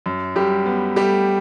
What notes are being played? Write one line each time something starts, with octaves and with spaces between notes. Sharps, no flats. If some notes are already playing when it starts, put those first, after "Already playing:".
F#2
F#2 G3 G4
B3
G3 A3 G4